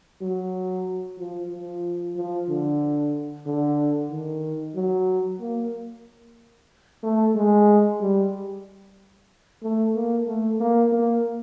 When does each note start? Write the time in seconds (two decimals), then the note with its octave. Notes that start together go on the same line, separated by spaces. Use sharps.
0.22 F#3
1.18 F3
1.51 F3
2.16 F3
2.49 D3
3.46 D3
4.11 D#3
4.76 F#3
5.40 A#3
7.03 A3
7.35 G#3
8.00 G3
9.62 A3
9.95 A#3
10.27 A3
10.60 A#3
10.92 A#3